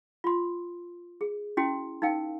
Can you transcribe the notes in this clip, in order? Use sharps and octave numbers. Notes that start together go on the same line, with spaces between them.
F4 C6
G#4
C#4 E4 F#4 G5 C6
D#4 A#4 F5 G5